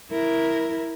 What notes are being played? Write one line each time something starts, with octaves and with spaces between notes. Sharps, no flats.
E4 A#4